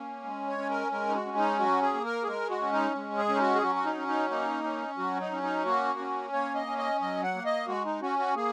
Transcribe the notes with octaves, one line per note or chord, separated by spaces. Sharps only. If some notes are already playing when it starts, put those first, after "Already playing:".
Already playing: A#3 C#4
G#3
C#5
C#4
A#4
G#3 A#4
D#4
F#4
C#4
D#4
F#3 F#4
G#4
A#3
A#4
G#4
G#3 A#4
F#4
C#4
D#4
G#3
G#4
C#4
D#4
F#4
G#4
F#3 F#4
F#4
D#4
C#4
D#4
A#3 D#4
C#4
F#3 F#4
D#4
C#4
D#4
A#3 F#4
C#4
A#3 C#5
D#5
C#4
D#5
F#3 D#5
F#5
A#3
D#5
G#3 F#4
D#4
C#4 F#4
F#4
A#3 G#4